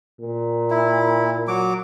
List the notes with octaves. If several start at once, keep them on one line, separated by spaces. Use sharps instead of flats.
A#2
E4
F#3 D6